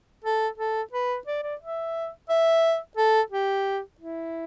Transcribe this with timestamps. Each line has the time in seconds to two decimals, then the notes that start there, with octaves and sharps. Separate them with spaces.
0.24 A4
0.58 A4
0.93 B4
1.27 D5
1.43 D5
1.61 E5
2.29 E5
2.97 A4
3.32 G4
4.00 E4